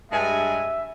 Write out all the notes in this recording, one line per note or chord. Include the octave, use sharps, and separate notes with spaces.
G2 G#3 E5 G#5